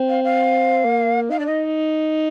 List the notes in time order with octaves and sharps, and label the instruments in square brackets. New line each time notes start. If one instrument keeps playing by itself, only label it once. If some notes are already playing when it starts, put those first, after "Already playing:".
Already playing: [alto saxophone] C4
[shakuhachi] F5
F5
[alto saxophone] A#3
[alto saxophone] D#4 [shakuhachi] F5
[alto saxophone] D4 [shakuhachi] D5
[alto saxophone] D#4 [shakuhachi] D#5